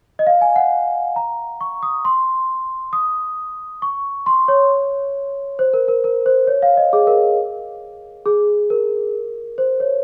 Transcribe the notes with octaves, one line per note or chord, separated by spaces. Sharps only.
D#5
F5
G#5
F#5
A#5
C#6
D#6
C6
D#6
C#6
C6
C#5
C5
A#4
A#4
A#4
C5
C#5
F5
D#5
G#4
A#4
G#4
A#4
C5
C#5